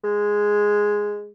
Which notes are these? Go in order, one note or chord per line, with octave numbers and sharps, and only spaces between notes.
G#3